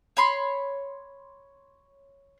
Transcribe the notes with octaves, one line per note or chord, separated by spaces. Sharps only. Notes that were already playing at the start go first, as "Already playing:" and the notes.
C#5 B5 C6